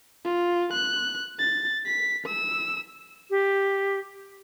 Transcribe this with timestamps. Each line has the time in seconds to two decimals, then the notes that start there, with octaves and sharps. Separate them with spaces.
0.24 F4
0.72 F#6
1.39 A6
1.86 B6
2.25 E6
3.30 G4